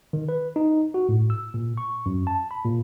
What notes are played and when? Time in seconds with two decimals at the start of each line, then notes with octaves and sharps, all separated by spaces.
0.13 D#3
0.29 B4
0.56 D#4
0.94 F#4
1.09 A2
1.30 E6
1.54 A#2
1.77 C#6
2.06 F#2
2.27 A5
2.51 B5
2.64 A#2